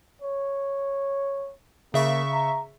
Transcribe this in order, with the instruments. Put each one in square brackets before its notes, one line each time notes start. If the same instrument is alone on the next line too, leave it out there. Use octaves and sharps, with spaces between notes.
[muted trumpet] C#5
[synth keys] C#3 E5 C#6 [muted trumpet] A#3
[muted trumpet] A#5